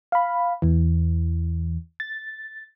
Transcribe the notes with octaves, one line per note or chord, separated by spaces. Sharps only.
F5 B5
E2 E3
A6